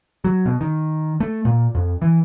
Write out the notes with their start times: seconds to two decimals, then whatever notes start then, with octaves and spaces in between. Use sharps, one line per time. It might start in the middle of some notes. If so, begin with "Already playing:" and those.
0.24 F#3
0.46 B2
0.61 D#3
1.20 A3
1.45 A#2
1.75 F2
2.02 E3